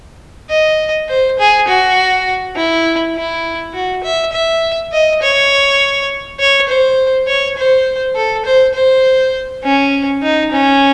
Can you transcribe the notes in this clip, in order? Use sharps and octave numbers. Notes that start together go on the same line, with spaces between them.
D#5
C5
G#4
F#4
E4
E4
F#4
E5
E5
D#5
C#5
C#5
C5
C#5
C5
A4
C5
C5
C#4
D#4
C#4